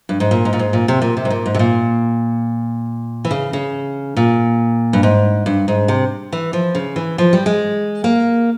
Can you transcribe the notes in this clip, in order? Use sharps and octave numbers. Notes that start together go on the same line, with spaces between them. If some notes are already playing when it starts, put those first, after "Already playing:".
G2
G#2
A#2
G#2
A#2
G#2
A#2
C3
A#2
C3
G#2
A#2
G#2
C3
A#2
E3
C#3
C#3
A#2
G2
G#2
G2
G#2
C3
E3
F3
C#3
E3
F3
G3
G#3
A#3